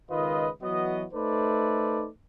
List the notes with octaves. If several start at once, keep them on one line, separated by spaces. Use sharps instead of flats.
C#2 D#3 F4 B4 D#5
E3 F#3 B3 F#4 D#5
A3 D#4 A4 B4 C5 D5